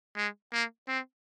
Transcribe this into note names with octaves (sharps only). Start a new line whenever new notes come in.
G#3
A#3
C4